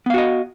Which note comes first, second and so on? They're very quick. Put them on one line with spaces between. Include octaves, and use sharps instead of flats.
B3 F5 F#4 D#5